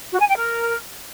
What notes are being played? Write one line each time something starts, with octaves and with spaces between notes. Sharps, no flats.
F#4
G#5
G5
A#4